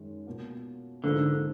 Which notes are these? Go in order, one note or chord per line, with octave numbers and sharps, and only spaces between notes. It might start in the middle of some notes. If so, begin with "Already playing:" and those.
Already playing: F#2 D#3 G#3
B2 A#3 F4
G#2 D3 F3 A#3 D#4